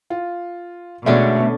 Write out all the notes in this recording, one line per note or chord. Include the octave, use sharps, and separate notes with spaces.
F4
B2 D3 G#3 A3 C#4 D4 F#4 E5